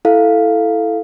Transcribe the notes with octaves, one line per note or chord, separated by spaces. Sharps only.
E4 A4 F5